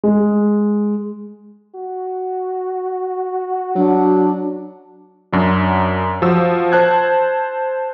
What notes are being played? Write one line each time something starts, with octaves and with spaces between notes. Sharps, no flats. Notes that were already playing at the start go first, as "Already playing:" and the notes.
G#3
F#4
F#3 D4
F#2 F#3 D4
F3 F#4 E6
C5 A5 F#6 G#6